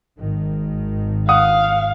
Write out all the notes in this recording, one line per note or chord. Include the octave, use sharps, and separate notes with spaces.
G#1 G#2 D#3
F5 F#5 D#6